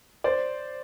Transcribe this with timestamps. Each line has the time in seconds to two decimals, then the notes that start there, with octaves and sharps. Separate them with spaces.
0.24 C5 D5